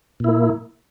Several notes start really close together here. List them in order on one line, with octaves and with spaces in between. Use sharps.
A#2 E4 A#3